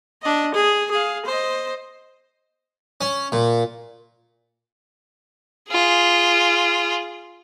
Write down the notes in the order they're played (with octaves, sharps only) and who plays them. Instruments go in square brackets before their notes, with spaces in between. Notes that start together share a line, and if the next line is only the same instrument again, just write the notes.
[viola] D4 D#5
G#4
G#4 F5
C5 D#5
[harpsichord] C#4
A#2
[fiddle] F4 G#4